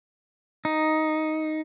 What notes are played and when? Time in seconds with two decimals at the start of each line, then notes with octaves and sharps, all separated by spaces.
0.65 D#4